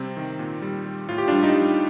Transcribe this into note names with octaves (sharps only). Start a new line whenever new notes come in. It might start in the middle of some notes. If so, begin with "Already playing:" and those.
Already playing: C3 G3 C4
D#3
A#2
G3
G3
A2 F4
G4
G3 D4 F4
D#4 G4
G3